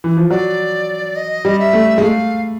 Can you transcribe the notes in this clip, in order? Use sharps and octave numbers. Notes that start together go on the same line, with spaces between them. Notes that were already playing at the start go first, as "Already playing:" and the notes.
E3
F3
F#3 D5
D#5
G3
E5
A3
G#3
A3 F5